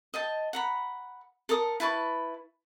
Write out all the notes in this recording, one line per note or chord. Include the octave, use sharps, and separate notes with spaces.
D#5 G5 A5
F#5 A#5 B5
A4 A#4 A5 D#6
E4 B4 A5 C#6